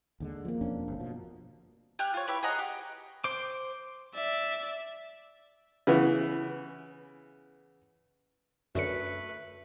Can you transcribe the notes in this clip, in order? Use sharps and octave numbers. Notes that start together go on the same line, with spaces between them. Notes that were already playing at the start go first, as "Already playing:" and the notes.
D#2 D3 G#3
F3 A#3
E1 F2 C#4 D4
G1 C3
B2 F3
G4 G#5 F6 F#6
F4 C#5
E4 G4 B4 C#5
G#4 D#5 F#5 A#5
G4
C5 D6
D5 E5
C#3 E3 B3
F#2 D3 A3 B4 C#7